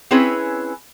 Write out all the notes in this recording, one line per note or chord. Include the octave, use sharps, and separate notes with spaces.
C4 C#4 E4 G#4 B4 C#5